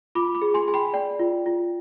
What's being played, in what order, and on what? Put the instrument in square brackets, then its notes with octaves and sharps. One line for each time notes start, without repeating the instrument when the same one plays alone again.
[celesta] F4 B5 D6
B5 D6
G#4
G#5 C6
G#4 G#5
G5 B5
D5 G5
F4
F4